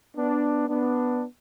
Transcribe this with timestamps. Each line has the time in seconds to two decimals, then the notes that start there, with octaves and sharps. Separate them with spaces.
0.16 B3 D4
0.68 B3 D4